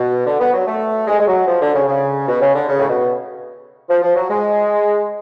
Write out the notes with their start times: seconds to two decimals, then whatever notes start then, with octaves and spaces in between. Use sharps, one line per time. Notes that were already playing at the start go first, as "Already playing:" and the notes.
Already playing: B2
0.26 D3
0.40 B3
0.53 F#3
0.67 A3
1.07 G#3
1.19 G#3
1.27 F#3
1.47 F3
1.61 D3
1.74 C#3
1.87 C#3
2.28 B2
2.41 C#3
2.55 D3
2.68 C#3
2.79 A2
2.88 B2
3.89 F3
4.02 F3
4.15 F#3
4.29 G#3